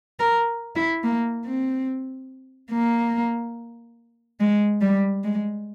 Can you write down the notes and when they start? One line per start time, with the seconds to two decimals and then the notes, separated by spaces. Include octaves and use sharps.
0.20 A#4
0.76 E4
1.04 A#3
1.46 C4
2.72 A#3
4.40 G#3
4.81 G3
5.24 G#3